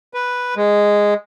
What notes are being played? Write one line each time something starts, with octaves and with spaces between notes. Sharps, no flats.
B4
G#3